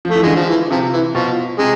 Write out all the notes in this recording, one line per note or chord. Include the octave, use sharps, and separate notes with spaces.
F3
A3
E3
D3 G#3
F3
E3
C3 F3
E3
B2 F3
C3 G#3